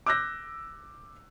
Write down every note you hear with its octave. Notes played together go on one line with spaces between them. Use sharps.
D6 E6 F#6 G6 A#6